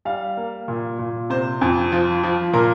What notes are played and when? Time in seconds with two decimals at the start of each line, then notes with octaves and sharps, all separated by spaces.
0.05 G3 F5
0.37 A#3
0.68 A#2
0.99 A#2
1.30 C3 C5
1.61 F2
1.92 F3
2.24 F3
2.53 A#2 A#4